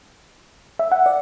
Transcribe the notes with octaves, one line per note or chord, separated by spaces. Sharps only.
E5
F#5
D5